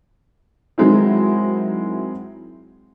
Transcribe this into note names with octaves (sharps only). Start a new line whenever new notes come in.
D#3 F#3 G#3 C4 E4